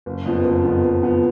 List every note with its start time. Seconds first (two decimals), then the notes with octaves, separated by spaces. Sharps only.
0.06 F#1
0.26 F2 F3 B3
0.44 F#1
0.64 F2 F3 B3
0.84 F#1
1.03 F3 B3